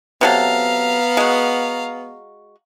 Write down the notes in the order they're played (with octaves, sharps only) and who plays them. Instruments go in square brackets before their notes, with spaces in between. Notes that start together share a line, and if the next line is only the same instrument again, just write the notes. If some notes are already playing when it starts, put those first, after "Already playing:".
[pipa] C3 F#3 A4 [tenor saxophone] B3 [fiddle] F5 A#5
[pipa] G#3 F#4